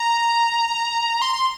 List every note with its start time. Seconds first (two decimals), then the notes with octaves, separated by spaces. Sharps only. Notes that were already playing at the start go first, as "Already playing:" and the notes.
Already playing: A#5
1.22 C6